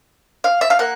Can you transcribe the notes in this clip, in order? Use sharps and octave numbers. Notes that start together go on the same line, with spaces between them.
F5
E5
F5
A#3 F#5